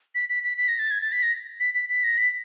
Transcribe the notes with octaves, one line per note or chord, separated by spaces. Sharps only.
B6
B6
B6
B6
A#6
A6
G#6
A6
B6
A#6
B6
B6
B6
A#6
B6